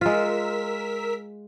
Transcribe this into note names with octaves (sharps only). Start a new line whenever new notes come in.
G#3 F4 A#4 E6 B6